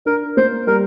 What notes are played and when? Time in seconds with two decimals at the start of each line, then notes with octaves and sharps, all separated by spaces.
0.06 D4 A#4
0.37 A#3 C5
0.67 G3 A#4